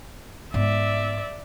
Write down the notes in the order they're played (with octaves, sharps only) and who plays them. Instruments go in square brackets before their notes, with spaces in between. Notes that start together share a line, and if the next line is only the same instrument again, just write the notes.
[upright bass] G#2 B3 [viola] D5 E5